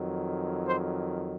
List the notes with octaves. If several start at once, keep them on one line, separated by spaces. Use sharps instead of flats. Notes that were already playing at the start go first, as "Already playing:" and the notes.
Already playing: F2 D#3 F#3
C5